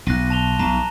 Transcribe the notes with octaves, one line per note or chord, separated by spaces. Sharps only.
B1 F#6 A#6 D#7
A5 F7 G7
B1 A#5 E7